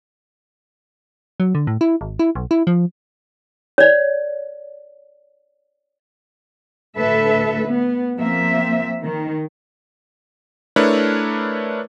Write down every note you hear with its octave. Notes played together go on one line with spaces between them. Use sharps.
F#3
D3
A2
E4
G#1
E4
B1
E4
F3
C#5 D5
D2 A2 A4 B4 E5
B3
F3 A#3 C4 E5
D#3
A3 D4 E4 A#4 B4 C#5